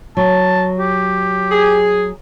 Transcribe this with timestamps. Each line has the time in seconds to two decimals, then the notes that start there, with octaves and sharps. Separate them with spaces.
0.17 F#3 A5
0.79 G4
1.52 G#4